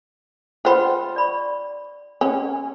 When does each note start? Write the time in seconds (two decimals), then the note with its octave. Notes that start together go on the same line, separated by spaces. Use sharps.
0.65 F4 C5 F#5 G5 B5
1.16 D5 B5 C#6
2.21 C#4